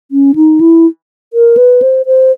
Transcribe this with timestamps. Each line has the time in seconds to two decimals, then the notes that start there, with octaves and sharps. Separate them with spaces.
0.11 C#4
0.35 D#4
0.60 E4
1.33 A#4
1.57 B4
1.82 C5
2.06 C5